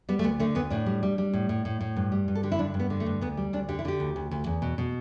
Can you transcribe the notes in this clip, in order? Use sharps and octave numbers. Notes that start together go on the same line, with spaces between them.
G3 B3
A3
D2 B3
D3 A3
D2 B3
A2 D4
G3
G3
G3
A2
A2
A2
A2
G2
G3
G2
A4
D3 G4
E4
G2 D4
G2
B3
D3
A3
G2
D2 B3
G3
D2 D4
D3 G4
E4
D3 G4
D2
D2
D2
E2
B2
B2